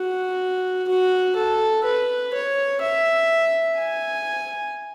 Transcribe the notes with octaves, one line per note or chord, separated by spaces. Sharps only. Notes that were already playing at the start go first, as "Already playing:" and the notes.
Already playing: F#4
F#4
A4
B4
C#5
E5
G#5